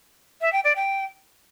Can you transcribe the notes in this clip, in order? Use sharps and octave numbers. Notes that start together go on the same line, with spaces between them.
E5
G5
D5
G5